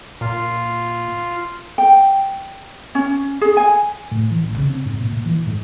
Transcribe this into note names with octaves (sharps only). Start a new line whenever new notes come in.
A#2 F4
G5
C#4
G#4
G#5
A2
E3
A1
C#3
C4
G#2
A#2
A#2
E3
G#2